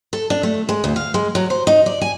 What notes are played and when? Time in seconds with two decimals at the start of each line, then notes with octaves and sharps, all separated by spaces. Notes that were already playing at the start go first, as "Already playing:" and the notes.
0.13 A4
0.30 D4
0.43 A3
0.69 G#3
0.84 D2
0.96 F5
1.14 G#3
1.35 F#3
1.50 C5
1.67 D#4
1.86 D5
2.01 G#5